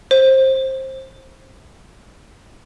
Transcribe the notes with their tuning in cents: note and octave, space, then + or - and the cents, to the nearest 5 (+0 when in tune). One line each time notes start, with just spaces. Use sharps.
C5 +20